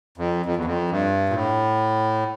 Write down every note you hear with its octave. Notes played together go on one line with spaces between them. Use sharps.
F2
F2
E2
F2
G2
A#2
A2